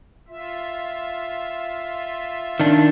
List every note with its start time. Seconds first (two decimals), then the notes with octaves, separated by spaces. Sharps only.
0.28 F4 E5
2.60 D#3 D4